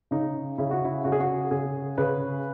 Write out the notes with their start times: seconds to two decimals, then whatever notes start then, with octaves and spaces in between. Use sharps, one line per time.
0.11 C#3 D#4
0.58 C#3 E4
0.71 F#4
0.85 E4
1.04 C#3 F#4
1.12 G#4
1.20 F#4
1.51 C#3 G#4
1.98 C#3 B4